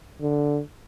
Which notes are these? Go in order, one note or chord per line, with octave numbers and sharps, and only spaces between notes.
D3